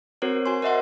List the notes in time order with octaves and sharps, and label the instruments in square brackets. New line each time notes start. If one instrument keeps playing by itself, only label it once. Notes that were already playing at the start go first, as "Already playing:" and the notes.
[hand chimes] C4 F#4 A#4 C5 C#5
F#4 G#5 C6
A#4 C5 D#5 E5 F#5 C6